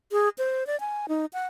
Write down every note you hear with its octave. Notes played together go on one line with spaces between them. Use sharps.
G#4
C5
D5
G#5
D#4
F#5